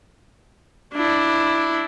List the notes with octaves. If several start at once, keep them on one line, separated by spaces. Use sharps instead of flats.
D4 E4